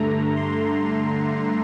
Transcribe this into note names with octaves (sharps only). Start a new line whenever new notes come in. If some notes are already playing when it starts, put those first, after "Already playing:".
Already playing: G2 D3 A3 A#5
C6